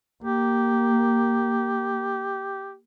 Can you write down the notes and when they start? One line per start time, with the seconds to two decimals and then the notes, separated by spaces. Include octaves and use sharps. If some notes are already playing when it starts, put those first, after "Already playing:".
0.24 A#3 G4